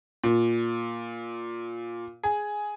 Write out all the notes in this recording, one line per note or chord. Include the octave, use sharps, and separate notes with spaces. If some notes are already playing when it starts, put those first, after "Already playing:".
A#2
G#4